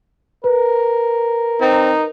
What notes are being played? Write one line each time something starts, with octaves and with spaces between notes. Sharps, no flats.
A#4 B4
C4 D#4